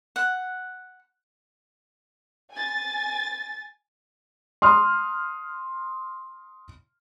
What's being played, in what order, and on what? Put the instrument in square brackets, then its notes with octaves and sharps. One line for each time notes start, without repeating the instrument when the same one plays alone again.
[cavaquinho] F#5
[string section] G#5 A6
[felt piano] C6 D#6 F6